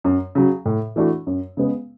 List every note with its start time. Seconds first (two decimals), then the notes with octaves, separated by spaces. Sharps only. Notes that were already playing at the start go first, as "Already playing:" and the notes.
0.04 F#2
0.35 C#3 F#3
0.66 A2
0.96 E3 A3 D4 F#4
1.27 F#2
1.57 C#3 G#3 B3